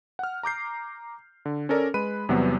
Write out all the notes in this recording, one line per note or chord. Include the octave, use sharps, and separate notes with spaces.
F#5 F6
A#5 D6 G6 C7
D3
C#4 A4 A#4 D5
G#3 B4 B5 F#6 D#7
E2 C3 F#3 G3 B3